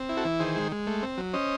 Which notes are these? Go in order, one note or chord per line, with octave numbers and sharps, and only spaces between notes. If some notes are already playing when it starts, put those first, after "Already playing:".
Already playing: C4
E4
F#4 A4
E3
D#3 G#4 C5
G#3
G#3
A3
C4
F#3
C#4 C5 D#5